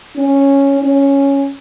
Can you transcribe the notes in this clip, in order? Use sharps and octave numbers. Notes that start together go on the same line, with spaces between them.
C#4
C#4